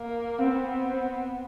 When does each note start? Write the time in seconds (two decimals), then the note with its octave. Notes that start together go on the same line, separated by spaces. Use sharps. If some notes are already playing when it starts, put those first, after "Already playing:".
Already playing: A#3
0.39 B3 C4
0.85 C4